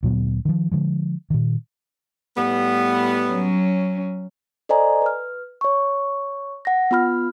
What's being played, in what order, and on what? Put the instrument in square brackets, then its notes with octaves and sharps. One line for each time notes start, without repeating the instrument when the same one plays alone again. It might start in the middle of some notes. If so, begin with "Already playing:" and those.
[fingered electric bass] D2 A#2 F#3 B3
D#3 F3
D3 F3 G#3
A#2 D#3
[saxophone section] A2 G3 B3
[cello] F#3 C#4
[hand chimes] A4 C5 D5 D#5 G#5 A#5
B4 F6
C#5 C#6
F#5 A#6
B3 F4 B5 F6